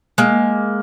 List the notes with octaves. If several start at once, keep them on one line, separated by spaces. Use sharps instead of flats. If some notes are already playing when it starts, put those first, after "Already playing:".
G#3 A#3